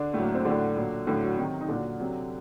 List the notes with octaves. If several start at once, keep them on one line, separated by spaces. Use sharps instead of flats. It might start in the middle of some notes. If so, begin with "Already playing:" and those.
Already playing: D3 D4
A2 F#3 A3
A#3
C4
A2 D3 F#3 D4
A#2 F#3
A2 D3 F#3 D4
F#3 F#4
C3 D#3 F#3
D#4
A#2 D3 F#3 D4
C3 F#3